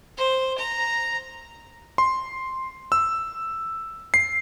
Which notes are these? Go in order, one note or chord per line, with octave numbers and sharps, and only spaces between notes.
C5
A#5
C6
E6
C7